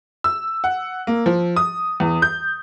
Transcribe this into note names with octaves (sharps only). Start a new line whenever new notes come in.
E6
F#5
A#3
F3
D#6
E2
G6